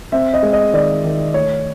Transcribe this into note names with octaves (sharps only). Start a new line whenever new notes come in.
C4 E5
D#5
G#3
D#5
D#3 D5
D#3
A3 C#5